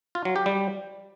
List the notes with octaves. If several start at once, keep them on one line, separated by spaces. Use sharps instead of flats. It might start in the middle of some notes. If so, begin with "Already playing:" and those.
F4
F#3
G4
G3